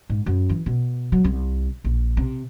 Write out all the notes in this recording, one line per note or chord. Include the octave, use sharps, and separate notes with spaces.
G#2
F#2
E3
B2
F#3
C2
A#1
C3